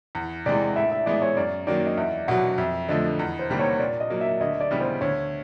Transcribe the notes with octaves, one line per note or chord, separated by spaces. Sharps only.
E2
C3 E3 G#3 D5
A2 E5
E5
E3 G#3 B3 E4 D5
C#5
F#2 D5
D#3 F#3 A#3 D5
D#5
E2 E5
B2 F#3 F#5
F2 E5
D3 F3 A3 D#5
E2
C5
C3 D#3 G3 A#3
C#5
A#2 D5
D#5
F#3 A#3
E5
D2 D#5
D5
C#3 E3 G3 B3
C5
D2 C#5